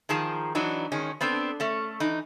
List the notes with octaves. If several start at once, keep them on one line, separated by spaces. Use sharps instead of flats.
D#3 F3 G#4 A5 A#5
E3 F#3 D4 D#4
D#3 G#3 C#4
B3 C4 D4 A4
A3 C#4
E3 D#4